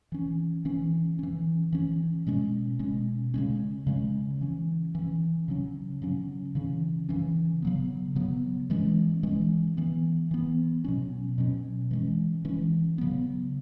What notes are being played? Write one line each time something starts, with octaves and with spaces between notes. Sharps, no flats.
E3 C#4
E3 C#4
E3 C#4
E3 C#4
B2 G#3 C#4
B2 G#3 C#4
C#3 G#3 C#4
C#3 G#3 C#4
E3 C#4
E3 C#4
C#3 F#3 C#4
C#3 F#3 C#4
C#3 E3 C#4
C#3 E3 C#4
C#3 F#3 B3
C#3 F#3 B3
E3 G#3 C#4
E3 G#3 C#4
E3 B3
E3 B3
B2 F#3 C#4
B2 F#3 C#4
E3 G#3 C#4
E3 G#3 C#4
C#3 F#3 B3